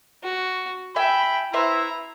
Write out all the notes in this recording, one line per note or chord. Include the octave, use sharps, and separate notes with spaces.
F#4
E5 G5 G#5 B5
E4 B4 C5 E5 A#5